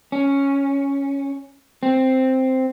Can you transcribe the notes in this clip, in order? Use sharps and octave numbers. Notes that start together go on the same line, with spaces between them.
C#4
C4